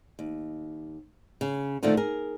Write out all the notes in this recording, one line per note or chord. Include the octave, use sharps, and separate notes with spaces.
D#2
C#3
A#2 D3 D#3 F3 A3 A4
G#4 A#4